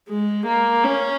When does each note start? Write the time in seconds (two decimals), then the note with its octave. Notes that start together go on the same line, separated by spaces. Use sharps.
0.09 G#3
0.46 A#3
0.84 C#4